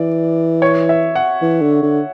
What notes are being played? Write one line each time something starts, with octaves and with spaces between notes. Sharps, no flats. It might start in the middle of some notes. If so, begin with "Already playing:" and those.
Already playing: E3 D5
C#5
E5
F#5
E3
D3
D3